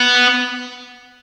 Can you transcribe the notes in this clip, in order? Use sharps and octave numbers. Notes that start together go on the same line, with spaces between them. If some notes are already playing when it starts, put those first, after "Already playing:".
Already playing: B3